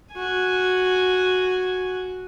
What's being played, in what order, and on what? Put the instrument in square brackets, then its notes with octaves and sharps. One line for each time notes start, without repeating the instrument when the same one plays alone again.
[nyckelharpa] F#4 G#5